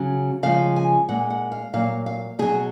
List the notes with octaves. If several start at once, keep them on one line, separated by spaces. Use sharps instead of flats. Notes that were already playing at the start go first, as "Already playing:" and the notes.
Already playing: C#3 F#3
C#3 F3 G#3 F5
G#5
A#2 G#3 F#5
F#5
F5
A#2 F#3 F5
F5
B2 F#3 G#4